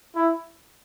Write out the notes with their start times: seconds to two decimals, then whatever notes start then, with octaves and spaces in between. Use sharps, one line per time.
0.16 E4